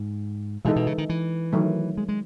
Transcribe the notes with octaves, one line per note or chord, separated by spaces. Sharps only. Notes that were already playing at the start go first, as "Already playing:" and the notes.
Already playing: G#2
B2 E3 G#3 D#4 A4
B2
C#3
D#3
E3
D#3 F#3 A3
G#3
G#3